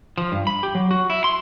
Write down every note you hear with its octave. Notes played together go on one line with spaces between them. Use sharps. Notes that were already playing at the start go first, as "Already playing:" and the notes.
F3
G2
B5
G4
F#3
F#4
E4
C6